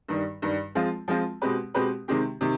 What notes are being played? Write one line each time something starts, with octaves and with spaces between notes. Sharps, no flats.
G2 D#3 G3
G2 D#3 G3
F3 G#3 C4 F4
F3 G#3 C4 F4
B2 G#3 C4 G4 B4
B2 G#3 C4 G4 B4
C3 D#3 G#3 C4 G4
C3 D#3